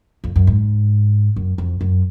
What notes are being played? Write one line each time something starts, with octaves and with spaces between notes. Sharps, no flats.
F2
F#2
G#2
F#2
F2
F#2